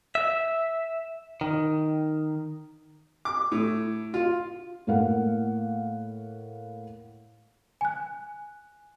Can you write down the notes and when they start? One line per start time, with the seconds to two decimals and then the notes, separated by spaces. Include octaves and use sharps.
0.15 E5
1.41 D#3
3.25 D6
3.52 A2
4.14 F4
4.87 A2 A#3 F5 F#5
7.81 G#5 F#6